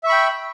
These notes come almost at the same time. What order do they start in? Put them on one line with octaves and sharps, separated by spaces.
E5 C#6 B5 G5